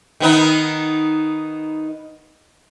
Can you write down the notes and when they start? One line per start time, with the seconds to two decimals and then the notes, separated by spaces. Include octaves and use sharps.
0.20 D#3 B3 D#4